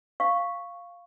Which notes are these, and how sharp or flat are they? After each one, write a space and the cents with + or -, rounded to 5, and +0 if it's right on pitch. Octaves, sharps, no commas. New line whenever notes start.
F5 +0 C#6 +0